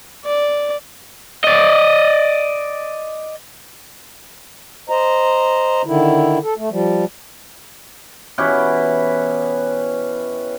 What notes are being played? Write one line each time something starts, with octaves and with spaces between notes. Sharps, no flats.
D5
D5 D#5
C5 D#5 A#5
D3 D#3 E4
A4
A3
F3 G3
B2 E3 C#4 G4